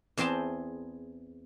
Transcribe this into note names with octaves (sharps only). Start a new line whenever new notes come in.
E2 C4 G#4 G5 A5